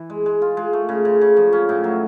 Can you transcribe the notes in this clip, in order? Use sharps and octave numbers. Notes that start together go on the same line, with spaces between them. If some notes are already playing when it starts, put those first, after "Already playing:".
Already playing: E3
G#3
G#3
F4
G#3
A3
C#3
C#3
C#3
F3
C#4
A2
F#3